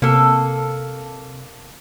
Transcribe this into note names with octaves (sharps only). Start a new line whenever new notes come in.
C3 A#3 A4